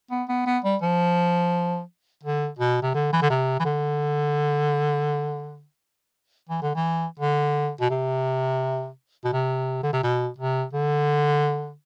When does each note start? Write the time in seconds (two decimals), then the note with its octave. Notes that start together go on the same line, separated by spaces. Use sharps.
0.11 B3
0.29 B3
0.46 B3
0.64 G3
0.82 F3
2.23 D3
2.59 B2
2.82 C3
2.94 D3
3.13 E3
3.22 D3
3.30 C3
3.60 E3
3.65 D3
6.49 E3
6.62 D3
6.75 E3
7.20 D3
7.80 B2
7.90 C3
9.25 B2
9.33 C3
9.83 D3
9.93 C3
10.03 B2
10.38 C3
10.74 D3